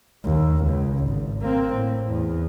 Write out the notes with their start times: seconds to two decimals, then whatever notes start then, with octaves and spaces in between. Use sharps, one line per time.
0.24 D#2
0.65 C#2
1.05 G#1
1.42 A#3 C4
1.75 A2
2.09 E2